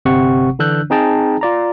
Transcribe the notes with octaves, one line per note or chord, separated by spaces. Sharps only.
G1 C3 C4 F#5 C#6
D3 E3 D4 E6 F#6 G6
C4 D#4 G#4 G5 A5 A#5
F4 D5 A#5